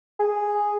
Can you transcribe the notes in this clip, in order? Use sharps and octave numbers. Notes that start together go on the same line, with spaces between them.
G#4